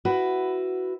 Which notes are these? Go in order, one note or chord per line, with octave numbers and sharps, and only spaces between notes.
E4 F#4 B4